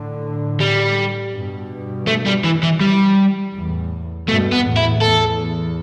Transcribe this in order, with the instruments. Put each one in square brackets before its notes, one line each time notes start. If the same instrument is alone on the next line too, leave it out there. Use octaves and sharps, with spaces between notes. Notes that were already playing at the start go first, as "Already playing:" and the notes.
Already playing: [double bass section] A2 D3
[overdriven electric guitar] G3
[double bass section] G2 B2
[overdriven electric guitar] A3
G3
E3
E3
G3
[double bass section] E2 A2
[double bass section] G2 B2 [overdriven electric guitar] A3
[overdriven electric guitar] B3
[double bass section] E2 A2
[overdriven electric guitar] E4
[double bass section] E2 [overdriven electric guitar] A4